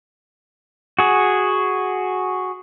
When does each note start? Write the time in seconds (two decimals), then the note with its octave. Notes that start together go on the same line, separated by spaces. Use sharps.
0.99 F#4 G#4